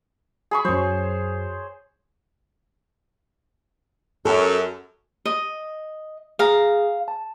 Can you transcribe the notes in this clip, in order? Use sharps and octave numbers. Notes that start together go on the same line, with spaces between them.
G#4 B5 C#6
F#2 F#3 C5 C#5
F#2 A4
D#5
G#4 F5 A#5
A5